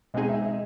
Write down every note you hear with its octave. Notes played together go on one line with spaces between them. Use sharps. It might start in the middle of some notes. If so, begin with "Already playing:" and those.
B2 G#3 C4 D#4 G#4 D#5
E5
D#5